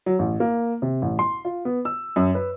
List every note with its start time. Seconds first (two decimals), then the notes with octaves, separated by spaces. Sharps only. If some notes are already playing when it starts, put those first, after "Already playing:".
0.06 F#3
0.19 A1
0.40 A#3
0.82 C3
1.02 A1
1.19 C6
1.45 F4
1.65 B3
1.85 E6
2.16 F#2
2.35 B4